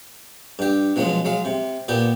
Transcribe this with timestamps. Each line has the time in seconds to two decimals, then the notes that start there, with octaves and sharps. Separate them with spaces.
0.59 G2 G4
0.96 B2 F3 F#3 G#3 C#4
1.25 F#3 G#3 F5
1.45 C3
1.88 A#2 B3 G4